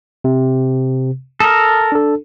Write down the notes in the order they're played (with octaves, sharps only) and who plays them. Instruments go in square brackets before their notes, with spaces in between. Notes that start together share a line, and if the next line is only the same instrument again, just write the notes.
[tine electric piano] C3
[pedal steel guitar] A4 A#4 [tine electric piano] D#6
[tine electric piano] D4 A4